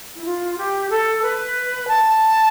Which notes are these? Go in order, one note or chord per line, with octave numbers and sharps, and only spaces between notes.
E4
F4
G4
A4
B4
A5